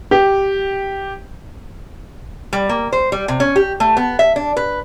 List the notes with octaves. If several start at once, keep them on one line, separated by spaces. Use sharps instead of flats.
G4
G3
A#3
C5
G3
C3
C#4
G4
A3
B3
E5
D4
B4